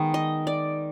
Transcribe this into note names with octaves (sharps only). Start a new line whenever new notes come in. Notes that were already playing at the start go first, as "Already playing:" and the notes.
Already playing: D#3 G#3 B3
D#5
D5